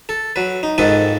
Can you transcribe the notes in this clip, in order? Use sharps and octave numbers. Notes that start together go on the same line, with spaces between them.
A4
F#3 B4
D#4
F2 G#2 D#3 A4 B4 D#6